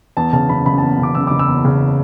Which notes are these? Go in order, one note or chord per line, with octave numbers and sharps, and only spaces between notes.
E2 A5
C#3 A5
F#1 B5
F#1 B5
E2 A5
C#3 D6
F#1 E6
F#1 D6
E6
E2
C#3